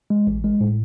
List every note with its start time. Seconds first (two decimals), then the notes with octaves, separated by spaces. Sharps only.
0.10 G#3
0.27 A1
0.44 G#3
0.61 A2